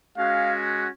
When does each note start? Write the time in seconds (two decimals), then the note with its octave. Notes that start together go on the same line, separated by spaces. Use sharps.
0.17 G#3 C#4 F#4 F5